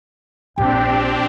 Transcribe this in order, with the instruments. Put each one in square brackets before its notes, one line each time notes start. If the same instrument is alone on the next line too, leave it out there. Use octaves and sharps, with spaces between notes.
[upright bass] A#1 [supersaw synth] C4 D4 G4 [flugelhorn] G5